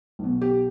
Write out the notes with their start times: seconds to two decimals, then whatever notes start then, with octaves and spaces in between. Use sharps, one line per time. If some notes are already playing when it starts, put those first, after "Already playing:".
0.19 B1 B2
0.41 G4